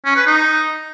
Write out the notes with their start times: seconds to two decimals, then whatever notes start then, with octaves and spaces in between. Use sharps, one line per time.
0.05 C#4
0.16 B4
0.27 D#4